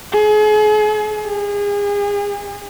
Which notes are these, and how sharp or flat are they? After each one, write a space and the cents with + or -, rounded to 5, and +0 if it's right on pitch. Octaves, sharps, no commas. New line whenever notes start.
G#4 +40
G#4 -35